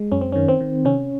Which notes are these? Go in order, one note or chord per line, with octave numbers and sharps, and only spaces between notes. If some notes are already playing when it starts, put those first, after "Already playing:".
Already playing: G#3
F#2 C#4
C4
D#3 C#4
C4
D#3
C3 C#4